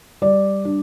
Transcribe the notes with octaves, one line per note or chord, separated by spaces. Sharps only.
G3 D5
D4